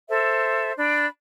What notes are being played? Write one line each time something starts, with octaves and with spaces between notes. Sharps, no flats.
A4 C5 E5
D4 B5